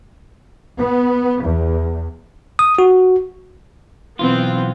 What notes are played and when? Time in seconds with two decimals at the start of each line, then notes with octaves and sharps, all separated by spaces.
0.79 B3
1.43 E2
2.59 D#6
2.79 F#4
4.19 B1 E3 B3 C4 F4